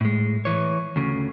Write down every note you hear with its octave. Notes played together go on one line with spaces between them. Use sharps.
A2 G#3
E3 C#5
D2 C#3